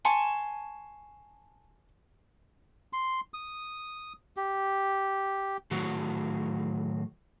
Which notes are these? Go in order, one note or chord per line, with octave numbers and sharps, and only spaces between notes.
G#5 A5 C6 C#6
C6
D#6
G4
A2 D#3 F#3 F#4